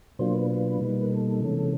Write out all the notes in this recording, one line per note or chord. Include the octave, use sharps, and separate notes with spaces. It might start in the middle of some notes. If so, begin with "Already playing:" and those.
B2 F#3 A#3 D4 F4 C5
B4
B4
B2 G3 A#3 D#4
A#4
A4
C3 E3 G#3 C#4